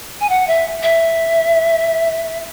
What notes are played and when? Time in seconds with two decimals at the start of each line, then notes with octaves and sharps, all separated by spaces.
0.21 G#5
0.29 F#5
0.47 E5
0.83 E5